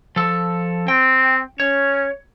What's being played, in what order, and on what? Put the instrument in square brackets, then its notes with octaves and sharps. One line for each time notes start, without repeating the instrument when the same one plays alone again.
[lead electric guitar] F3 A4
[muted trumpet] C4 [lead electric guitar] G5
[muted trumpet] C#4 [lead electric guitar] C#5